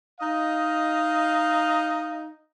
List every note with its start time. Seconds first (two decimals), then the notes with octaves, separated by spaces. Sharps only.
0.21 D#4 D#5 F5